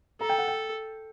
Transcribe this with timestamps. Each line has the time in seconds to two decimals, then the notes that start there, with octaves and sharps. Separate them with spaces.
0.21 A4 A#5
0.29 G5
0.38 F#5
0.48 G5